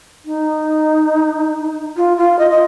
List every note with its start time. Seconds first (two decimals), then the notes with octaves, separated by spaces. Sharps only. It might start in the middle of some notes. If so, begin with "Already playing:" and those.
0.25 D#4
1.97 F4
2.17 F4
2.39 D#5
2.50 D#5